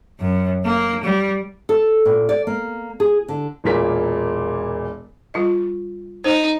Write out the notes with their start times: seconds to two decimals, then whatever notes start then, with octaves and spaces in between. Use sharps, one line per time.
0.19 F#2
0.65 A#3
1.03 G3
1.69 A4
2.05 A#2
2.29 D5
2.47 A#3
3.00 G#4
3.28 D3
3.64 E1 A#2 A#3 B6
5.34 G3 F4 D#5
6.24 D#4 C5